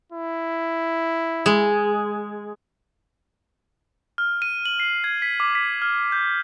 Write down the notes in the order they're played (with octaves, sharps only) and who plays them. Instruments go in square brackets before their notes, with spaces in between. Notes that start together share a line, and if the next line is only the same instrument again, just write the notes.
[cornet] E4
[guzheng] G#3
[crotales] F6
D#7
F#7
C7
G#6
B6
D6
B6
F6
G6